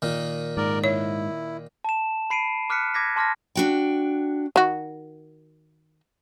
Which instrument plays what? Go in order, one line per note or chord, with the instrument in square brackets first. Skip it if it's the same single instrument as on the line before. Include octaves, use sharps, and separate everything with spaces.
[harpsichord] A#2 D#3
[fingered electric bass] G#2 [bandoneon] A#4 D5
[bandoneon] E4 [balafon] C#5
[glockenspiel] A5 E7
B5 C7 D7 D#7
D6 F6 F#6 B6 C#7
D6 G#6 A#6 B6
A5 C6 D6 F6 G#6 A#6
[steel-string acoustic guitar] D4 F#4 G5
[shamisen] D#3 F#4